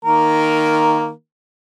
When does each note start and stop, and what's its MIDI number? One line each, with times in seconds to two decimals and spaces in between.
0.05 1.10 51
0.05 1.10 58
0.05 1.10 70